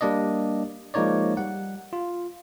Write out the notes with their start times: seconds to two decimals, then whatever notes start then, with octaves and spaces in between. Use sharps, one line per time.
0.01 G3 A#3 D4 D5 D#5
0.94 F3 G#3 A#3 D#4 C#5 D5
1.37 G3 F#5
1.93 F4